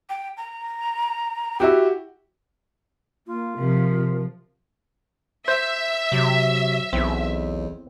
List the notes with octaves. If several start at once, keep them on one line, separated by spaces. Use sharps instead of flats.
G5
A#5
E4 F#4 G4 F#5
A#3 F4
C3 F3 A#4
C5 E5
C3 F#3
B1 E2 C4